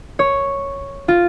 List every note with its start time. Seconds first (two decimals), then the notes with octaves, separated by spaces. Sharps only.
0.19 C#5
1.08 F4